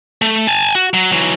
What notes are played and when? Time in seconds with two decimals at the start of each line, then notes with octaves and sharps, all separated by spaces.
0.22 A3
0.47 G#5 A5
0.75 F#4
0.94 F#3
1.12 E3 F#3